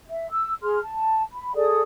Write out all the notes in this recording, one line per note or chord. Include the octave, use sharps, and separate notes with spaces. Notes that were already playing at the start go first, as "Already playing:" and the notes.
E5
E6
G#4 C6 F6
A5
B5
G#4 A4 D5 D#6